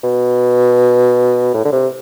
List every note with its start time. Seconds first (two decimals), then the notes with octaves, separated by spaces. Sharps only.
0.03 B2
1.54 A2
1.65 D3
1.72 C3